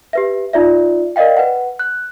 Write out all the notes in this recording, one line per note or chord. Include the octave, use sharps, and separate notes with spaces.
G4 B4 E5
D#4 F4 D5 E5
A#4 D5 D#5 F5 G5
B4 F#5
F#6